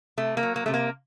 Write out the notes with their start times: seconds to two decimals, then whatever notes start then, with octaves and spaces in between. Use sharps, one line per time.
0.17 C3 A3
0.37 A#3
0.43 F#3
0.56 A#3
0.66 C3 A3
0.74 A#3